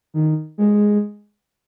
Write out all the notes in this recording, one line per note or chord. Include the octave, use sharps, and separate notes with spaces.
D#3
G#3